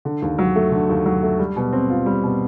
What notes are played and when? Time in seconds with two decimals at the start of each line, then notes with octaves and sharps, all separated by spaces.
0.05 D3
0.22 D#2
0.39 F#3
0.56 A3
0.71 D3
0.89 D#2
1.06 F#3
1.23 A3
1.39 G3
1.56 B2
1.73 C4
1.90 F4
2.06 G3
2.23 B2